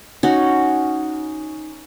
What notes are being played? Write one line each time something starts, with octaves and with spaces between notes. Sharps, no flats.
C#4 D#4 F#4